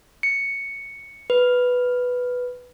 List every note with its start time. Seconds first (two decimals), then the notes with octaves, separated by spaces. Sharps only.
0.23 C#7
1.30 B4